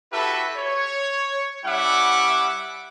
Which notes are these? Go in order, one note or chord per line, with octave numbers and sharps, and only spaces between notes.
E4 F#4 G4 A4 B4 E5
C#5
G3 C#4 E4 E5 F#5 D6